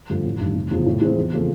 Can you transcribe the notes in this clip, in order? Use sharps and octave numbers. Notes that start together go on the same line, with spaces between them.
G2 D3 F3 A3
A1
G2 D#3
F1
E2 C#3 F3
A2
E3 G#3 C4 F4
E2
C#3 F3 A3 C4